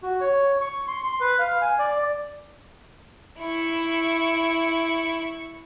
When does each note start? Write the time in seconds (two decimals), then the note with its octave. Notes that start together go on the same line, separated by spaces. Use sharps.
0.03 F#4
0.21 C#5
0.61 C#6
0.88 C6
1.03 C6
1.21 B4
1.39 F5
1.61 G#5
1.79 D5
3.39 E4 C#6